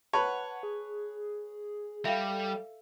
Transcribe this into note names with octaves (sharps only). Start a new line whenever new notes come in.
B4 C#5 F#5 A5
G#4
G3 A4 E5 F5